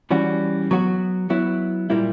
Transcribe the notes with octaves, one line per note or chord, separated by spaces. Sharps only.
E3 G3 C#4 F#4
F#3 B3 F#4
F#3 B3 E4
A#2 G3 A#3 E4